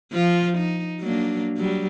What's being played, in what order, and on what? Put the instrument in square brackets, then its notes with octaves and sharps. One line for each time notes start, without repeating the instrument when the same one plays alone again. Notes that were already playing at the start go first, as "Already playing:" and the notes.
[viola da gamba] F3 F4
D#4
F#3 A#3 D4
F#3 G3